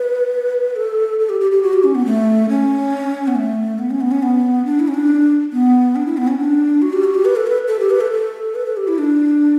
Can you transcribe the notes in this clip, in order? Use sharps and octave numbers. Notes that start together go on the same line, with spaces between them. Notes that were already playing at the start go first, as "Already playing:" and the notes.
Already playing: B4
A4
A4
G4
G4
G4
F#4
G4
C#4
B3
A3
C#4
B3
A3
B3
C#4
B3
C#4
B3
D4
E4
C#4
D4
B3
D4
E4
B3
C#4
D4
F#4
G4
F#4
G4
B4
A4
B4
A4
G4
B4
A4
A4
B4
A4
G4
E4
D4